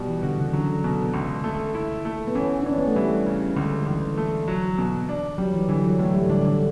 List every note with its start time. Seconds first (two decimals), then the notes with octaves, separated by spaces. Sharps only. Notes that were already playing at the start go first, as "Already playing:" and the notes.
Already playing: B2 G3
0.08 E3
0.23 D3 F#4
0.38 C#3
0.53 D3 F#3
0.84 B2
1.14 C#2
1.44 A3
1.75 E4
2.05 A3
2.28 B3
2.35 E3 C#4
2.62 D4
2.66 E3 C#4
2.78 B3
2.87 A3
2.96 E3 G3
3.26 C#3
3.57 C#2 D3
3.80 D3
3.86 C#2 E3
4.18 A3
4.48 F#3
4.78 B2
5.09 D4
5.38 F#3 G3
5.54 E3
5.69 D3 E3
5.84 F#3
5.99 A2 A3
6.14 G3
6.29 D3 D4
6.45 D3